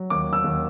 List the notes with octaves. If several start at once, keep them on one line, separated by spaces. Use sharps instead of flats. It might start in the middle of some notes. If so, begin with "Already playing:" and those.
Already playing: F#3
D#2 D6
E6
D#2